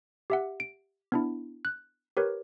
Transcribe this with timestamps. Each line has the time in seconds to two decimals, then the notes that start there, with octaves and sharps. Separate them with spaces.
0.30 G4 E5 F#5
0.60 D7
1.12 B3 D4 E4
1.65 F#6
2.17 G4 A#4 B4 C#5